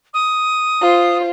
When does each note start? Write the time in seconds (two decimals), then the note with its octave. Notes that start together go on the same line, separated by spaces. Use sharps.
0.13 D#6
0.81 F4 C5